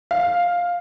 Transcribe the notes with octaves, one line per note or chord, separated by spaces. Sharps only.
F5